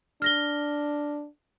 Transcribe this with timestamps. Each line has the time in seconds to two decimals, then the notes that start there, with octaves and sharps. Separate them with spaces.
0.22 D4 F6 A#6 G7